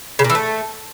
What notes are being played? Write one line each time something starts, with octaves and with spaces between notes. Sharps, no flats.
C#3
A#2
E3
A3